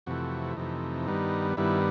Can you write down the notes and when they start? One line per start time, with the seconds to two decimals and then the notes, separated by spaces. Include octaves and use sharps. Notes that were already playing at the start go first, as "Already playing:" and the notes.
0.06 F2 C3 E3 A3 F#4
0.57 F2 C3 E3 A3 D#4
1.07 G2 D#3 G3 B3
1.57 G2 D#3 G3 B3 E4